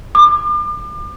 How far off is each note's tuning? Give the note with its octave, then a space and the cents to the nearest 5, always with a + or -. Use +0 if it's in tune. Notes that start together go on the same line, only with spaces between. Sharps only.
D6 +35